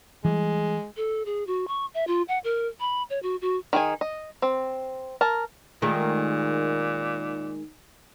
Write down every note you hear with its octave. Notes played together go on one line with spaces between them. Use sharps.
E3 G3 G#3
A4
G#4
F#4
C#6
E5
F4
F#5
A#4
B5
C#5
F#4
F#4
D#3 G#4 G#5
D#5
C4
A#4 A5
A#2 D#3 G#3 A3